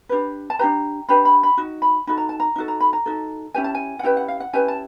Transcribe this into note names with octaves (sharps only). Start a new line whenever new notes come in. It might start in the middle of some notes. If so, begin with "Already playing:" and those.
D4 G4 B4
A5
D4 G4 B4 A#5
D4 G4 B4 B5
B5
B5
D#4 F#4
B5
D#4 F#4 A4 B5
A#5
A5
A#5
D#4 F#4 A4
A#5
B5
A#5
D#4 F#4 A4
C#4 E4 G4 B4 G#5
A5
G#5
F#5
C#4 E4 G4 B4 G5
F#5
F5
F#5
C#4 E4 G4 B4 G#5
A5